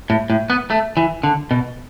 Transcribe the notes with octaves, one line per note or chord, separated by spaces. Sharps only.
A2
A2
B3
A3
E3
D3
B2